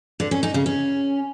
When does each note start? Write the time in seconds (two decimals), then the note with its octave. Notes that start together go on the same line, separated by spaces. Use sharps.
0.20 D3
0.31 C#4
0.43 D#4
0.54 C#3
0.66 C#4